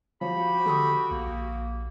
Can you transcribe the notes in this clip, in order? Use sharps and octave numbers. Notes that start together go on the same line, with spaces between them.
F3 F#4 G4 B5
D3 A4 C#6 D#6
A#1 A#3